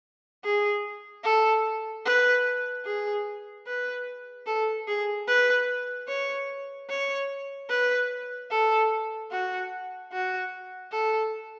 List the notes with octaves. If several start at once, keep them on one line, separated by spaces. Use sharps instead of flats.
G#4
A4
B4
G#4
B4
A4
G#4
B4
C#5
C#5
B4
A4
F#4
F#4
A4